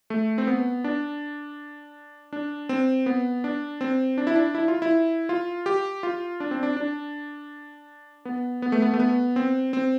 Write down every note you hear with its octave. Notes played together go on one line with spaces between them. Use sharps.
A3
C4
B3
D4
D4
C4
B3
D4
C4
D4
E4
D4
E4
F4
E4
F4
G4
F4
D4
C4
D4
D4
B3
B3
A3
B3
A3
B3
C4
C4